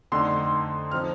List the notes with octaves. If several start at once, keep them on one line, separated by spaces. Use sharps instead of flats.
F2 D3 A3 D#4 C6
F3 C4 D#4 F6